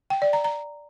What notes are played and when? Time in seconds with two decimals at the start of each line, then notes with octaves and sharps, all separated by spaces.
0.10 G5
0.22 D5
0.33 A#5
0.44 A#5